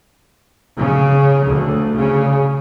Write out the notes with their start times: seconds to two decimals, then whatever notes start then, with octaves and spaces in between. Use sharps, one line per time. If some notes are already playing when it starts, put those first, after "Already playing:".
0.78 C#3
1.48 D2
1.98 C#3